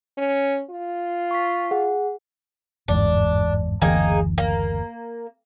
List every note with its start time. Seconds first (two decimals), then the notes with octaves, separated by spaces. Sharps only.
0.18 C#4
0.70 F4
1.31 C#6 B6
1.71 G#4 F#5
2.88 G1 E2 G#2 D4
3.81 F#1 D2 E3 A#3 D#4 G#4
4.38 A#3